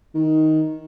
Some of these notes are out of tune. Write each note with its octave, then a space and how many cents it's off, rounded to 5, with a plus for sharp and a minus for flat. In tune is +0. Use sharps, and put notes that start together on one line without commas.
D#3 +10